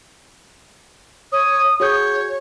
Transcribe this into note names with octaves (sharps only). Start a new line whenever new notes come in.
C#5 D#6
F#4 G#4 C#5 G6